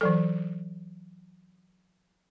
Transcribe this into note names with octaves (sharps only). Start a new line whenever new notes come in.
E3 F#3 A4